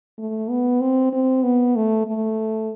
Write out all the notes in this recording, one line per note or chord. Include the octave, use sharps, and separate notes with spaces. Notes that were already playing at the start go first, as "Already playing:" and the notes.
A3
B3
C4
C4
B3
A3
A3